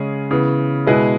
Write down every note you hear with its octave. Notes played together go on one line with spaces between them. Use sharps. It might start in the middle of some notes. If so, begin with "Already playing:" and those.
Already playing: C#3 G#3 C#4 G#4
C#3 E3 B3
B2 G#3 E4 G#4 B4